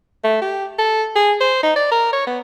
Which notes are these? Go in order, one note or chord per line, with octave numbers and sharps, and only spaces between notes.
A3
G4
A4
G#4
C5
D#4
D5
A#4
C#5
B3